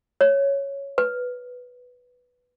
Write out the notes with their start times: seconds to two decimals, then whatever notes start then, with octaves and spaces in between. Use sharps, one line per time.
0.21 C#5
0.98 B4